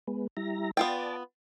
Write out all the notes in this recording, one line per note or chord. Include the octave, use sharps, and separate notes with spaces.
G#3 B3
G3 E4 A#5
B3 F4 D5 G5 A5